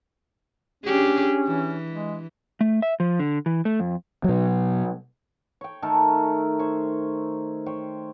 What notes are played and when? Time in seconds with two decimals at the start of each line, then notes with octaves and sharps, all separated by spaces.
0.84 C#4 D4 G4 G#4
1.47 E3
1.92 G#3
2.61 A3
2.82 E5
3.00 F3
3.19 D3
3.46 E3
3.65 A3
3.80 F2
4.24 B2 F#3
5.61 C#5 G5
5.82 D#3 A3 A4 A#4
6.59 C5 C#5
7.66 C5 C#5 G5